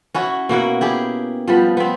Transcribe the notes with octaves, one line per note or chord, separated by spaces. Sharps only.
C#4 E4 F#4
B2 A#3 E4 F#5
E4 G4 G#4
F3 G3 B3
B3 C4